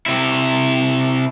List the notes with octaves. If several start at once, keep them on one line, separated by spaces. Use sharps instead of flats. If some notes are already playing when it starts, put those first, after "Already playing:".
C3 E4